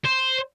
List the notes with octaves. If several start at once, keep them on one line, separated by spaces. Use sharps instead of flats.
C5